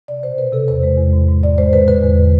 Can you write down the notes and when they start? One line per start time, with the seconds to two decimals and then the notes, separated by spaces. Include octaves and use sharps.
0.08 C3 D5
0.23 B2 C5
0.38 B2 B4
0.53 C3 A4
0.68 E2 C5
0.83 G#3
0.98 E2
1.13 G#2
1.29 G#2
1.43 A2 D5
1.58 G#3 C5
1.73 D3 B4
1.88 D3 B4
2.03 E2